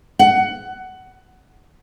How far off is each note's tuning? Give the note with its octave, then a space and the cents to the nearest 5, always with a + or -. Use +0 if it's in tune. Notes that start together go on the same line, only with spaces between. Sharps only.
F#5 +15